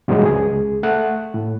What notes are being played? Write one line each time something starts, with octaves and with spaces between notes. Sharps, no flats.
G2 B2 E3 F#3 G#3
C#2 G#4
A3 F#5 F#6
A2